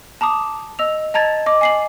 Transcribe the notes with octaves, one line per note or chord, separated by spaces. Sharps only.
A5 A#5 D6 D#6
D#5 E6 F7
D#5 A5 A#5 G#6 A6
D#5 D6
G#5 C7 F#7